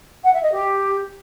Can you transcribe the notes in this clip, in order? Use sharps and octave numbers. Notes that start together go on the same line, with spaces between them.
F#5
E5
D#5
G4